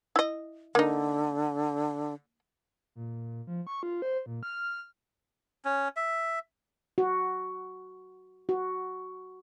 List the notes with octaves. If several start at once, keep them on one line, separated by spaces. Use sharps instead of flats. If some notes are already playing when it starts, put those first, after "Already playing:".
E4 D#5
D3 A#3 D#4
A#2
F3
C#6
F4
C5
A#2
F6
C#4
E5
F#4
F#4